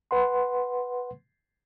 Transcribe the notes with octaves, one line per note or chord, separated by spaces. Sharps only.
B4 F#5 C6